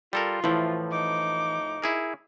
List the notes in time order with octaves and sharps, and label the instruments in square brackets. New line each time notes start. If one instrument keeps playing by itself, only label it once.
[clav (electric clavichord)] G3 A4 A#4 [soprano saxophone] F4
[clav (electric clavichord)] A2 F3 [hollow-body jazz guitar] E3
[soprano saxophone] D#4 [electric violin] D6
[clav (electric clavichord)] E4 G#4 A#4